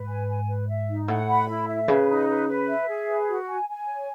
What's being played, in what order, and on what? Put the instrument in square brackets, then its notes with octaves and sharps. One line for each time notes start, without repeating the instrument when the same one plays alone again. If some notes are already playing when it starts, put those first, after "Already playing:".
Already playing: [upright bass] G#2 [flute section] B4
[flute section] G#5
G#5
B4
E5
D#4
[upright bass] A2 [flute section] F#5
[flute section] B5
E4
E5
[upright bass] C#3 [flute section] B4
[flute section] D#4
B4
B4
E5
G#4
B4
F#4
G#5
G#5
C#5